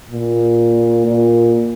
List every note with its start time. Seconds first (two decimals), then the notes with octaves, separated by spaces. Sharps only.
0.11 A#2
1.06 A#2